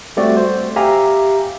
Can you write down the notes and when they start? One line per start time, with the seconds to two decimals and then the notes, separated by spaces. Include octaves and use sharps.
0.17 G3 A3 C4 F#4 D5
0.37 C5
0.76 G4 E5 F5 G#5 A#5